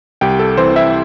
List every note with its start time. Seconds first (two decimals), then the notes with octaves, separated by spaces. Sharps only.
0.21 C2 G4 G5
0.39 A4
0.57 E3 C4 C5
0.76 E4 E5